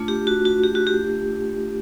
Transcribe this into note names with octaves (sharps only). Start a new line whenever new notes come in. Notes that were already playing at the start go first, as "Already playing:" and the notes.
Already playing: A3 D4 F4
G4
F#4
F#4
G4
F#4
G4